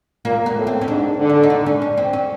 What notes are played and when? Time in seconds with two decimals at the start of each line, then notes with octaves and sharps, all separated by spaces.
0.25 A#2 A#3
0.46 B3
0.56 A2
0.67 C4
0.81 C#4
0.88 G#2 D4
1.19 D3
1.29 C#4
1.43 D#4
1.50 D4
1.66 C#4
1.82 C#4
1.97 C4
2.13 C#4